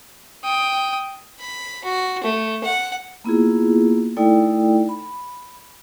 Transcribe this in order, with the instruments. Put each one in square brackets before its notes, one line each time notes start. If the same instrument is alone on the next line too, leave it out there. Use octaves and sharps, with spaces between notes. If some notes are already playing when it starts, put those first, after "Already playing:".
[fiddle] G5 D#6
B5
F#4
A3
F#5
[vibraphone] A#3 B3 E4 F4 G#4
A3 D#4 E4 A4 D5 G5
B5